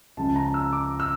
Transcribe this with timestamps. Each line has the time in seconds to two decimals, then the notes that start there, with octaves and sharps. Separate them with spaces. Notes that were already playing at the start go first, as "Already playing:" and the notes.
0.17 C#2 C#3 F3 A5
0.36 A#5
0.54 E6
0.73 D6
1.00 E6